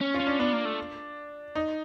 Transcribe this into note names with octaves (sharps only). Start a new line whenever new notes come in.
C#4
F4
C#4
D4
B3 D4
A#3
A3
D#4